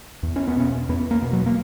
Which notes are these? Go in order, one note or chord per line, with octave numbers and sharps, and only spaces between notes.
E2
C#4
B3
B2 C#4
E2 B3
A#3
B2
F#3
A#3